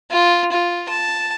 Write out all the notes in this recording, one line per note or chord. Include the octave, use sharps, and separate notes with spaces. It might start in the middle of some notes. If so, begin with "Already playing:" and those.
F4
F4
A5